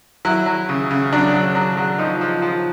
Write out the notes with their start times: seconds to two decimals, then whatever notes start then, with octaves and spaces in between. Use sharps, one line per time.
0.25 F#3 E4
0.46 F#3
0.69 C#3
0.91 C#3
1.12 F#3 D4
1.33 F#3
1.55 F#3
1.77 F#3
1.98 F3 D#4
2.21 F3
2.42 F3